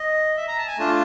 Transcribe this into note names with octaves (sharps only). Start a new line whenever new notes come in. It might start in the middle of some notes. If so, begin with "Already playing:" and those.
Already playing: D#5
E5
A#5
A5
G#5
A3 D4 F4 A5